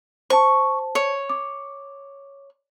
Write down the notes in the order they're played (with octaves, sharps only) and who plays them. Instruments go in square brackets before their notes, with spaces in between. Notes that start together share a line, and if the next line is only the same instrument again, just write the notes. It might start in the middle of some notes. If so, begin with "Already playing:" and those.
[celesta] C5 A5 [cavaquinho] C#6
[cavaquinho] C#5
[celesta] D6